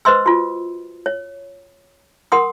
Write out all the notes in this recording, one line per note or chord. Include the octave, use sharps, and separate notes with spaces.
B4 C5 D#5 C6 E6
F4 F#4
C#5
A#4 F#5 C6 D#6